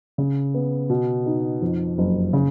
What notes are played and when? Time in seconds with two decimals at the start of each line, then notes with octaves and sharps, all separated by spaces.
0.18 C#3
0.54 B3
0.89 B2
1.26 D#4
1.62 F2
1.98 F#1
2.33 C#3